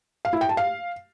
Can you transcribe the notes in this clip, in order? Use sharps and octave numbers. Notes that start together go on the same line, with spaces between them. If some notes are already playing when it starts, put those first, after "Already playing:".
F5
E4
G5
A5
F5